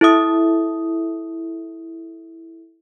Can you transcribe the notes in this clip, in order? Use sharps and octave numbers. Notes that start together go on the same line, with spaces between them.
E4 A4 E5 D#6